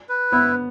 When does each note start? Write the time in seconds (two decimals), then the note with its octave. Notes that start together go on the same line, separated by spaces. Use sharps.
0.09 B4
0.32 B3 E4